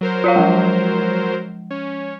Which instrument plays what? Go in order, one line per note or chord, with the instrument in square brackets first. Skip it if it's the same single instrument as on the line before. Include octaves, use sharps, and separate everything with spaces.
[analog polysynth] F#3 A#4 C5
[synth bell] F4 C#5 F5
F3 G#3
[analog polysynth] C#4